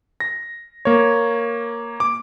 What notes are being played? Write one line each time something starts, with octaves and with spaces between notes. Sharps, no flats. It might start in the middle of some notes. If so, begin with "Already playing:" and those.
A#6
A#3 C#5
D6